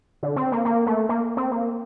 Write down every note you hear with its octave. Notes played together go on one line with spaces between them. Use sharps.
D3
C4
A#3
A#3
A3
A#3
C4
A#3